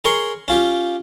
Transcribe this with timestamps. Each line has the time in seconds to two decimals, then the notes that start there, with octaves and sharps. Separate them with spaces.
0.05 G#4 A#4 C#5 C6 C#6
0.48 C#4 F4 G4